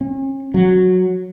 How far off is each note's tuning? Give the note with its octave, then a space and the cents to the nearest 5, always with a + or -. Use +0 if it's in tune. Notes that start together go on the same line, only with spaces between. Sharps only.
C#4 -40
F#3 -10